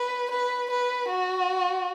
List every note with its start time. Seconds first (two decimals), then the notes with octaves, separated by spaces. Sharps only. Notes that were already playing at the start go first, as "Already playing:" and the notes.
Already playing: B4
0.31 B4
0.71 B4
1.09 F#4